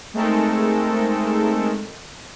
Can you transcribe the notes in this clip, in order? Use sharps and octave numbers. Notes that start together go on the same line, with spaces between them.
G#3 A3 C4 D#4 A4 A#4